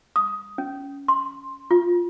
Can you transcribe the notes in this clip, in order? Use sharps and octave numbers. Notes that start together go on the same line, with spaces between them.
D#6
C#4
C6
F4